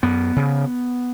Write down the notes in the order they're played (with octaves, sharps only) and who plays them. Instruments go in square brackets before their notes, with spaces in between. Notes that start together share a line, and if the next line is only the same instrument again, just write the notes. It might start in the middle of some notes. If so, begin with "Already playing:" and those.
[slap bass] F#2 B3
C#3